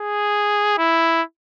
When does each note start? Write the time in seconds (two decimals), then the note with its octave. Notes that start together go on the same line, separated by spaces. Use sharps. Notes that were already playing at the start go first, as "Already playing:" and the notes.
Already playing: G#4
0.78 E4